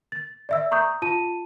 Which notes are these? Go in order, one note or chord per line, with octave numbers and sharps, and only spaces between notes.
A6
D5 E5 E6
A#5 C#6 D#6 G6
F4 A5 D#7